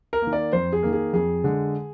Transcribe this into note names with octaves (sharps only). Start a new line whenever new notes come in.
A#4
D#3 A#3
D5
F2 C5
G#4
D#3 A#3
G#4
F2 G#4
D3 G#3